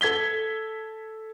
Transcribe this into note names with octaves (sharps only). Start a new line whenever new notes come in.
A4 G#6 B6 G7